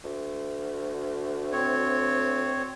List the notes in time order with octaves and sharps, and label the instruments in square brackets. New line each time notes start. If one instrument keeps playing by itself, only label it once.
[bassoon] D2
[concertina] C4 C#5